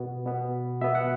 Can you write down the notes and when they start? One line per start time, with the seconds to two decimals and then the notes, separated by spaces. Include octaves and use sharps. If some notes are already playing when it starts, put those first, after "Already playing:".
Already playing: B2 B3
0.25 B2 B3
0.81 B2 B3 E5
0.95 F#5